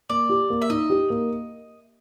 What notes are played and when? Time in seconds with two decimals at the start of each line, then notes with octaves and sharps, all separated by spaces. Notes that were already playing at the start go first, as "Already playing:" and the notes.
0.10 A#3 D5
0.29 G4
0.50 A#3
0.62 E5
0.70 D#4 D#5
0.90 G4
1.10 A#3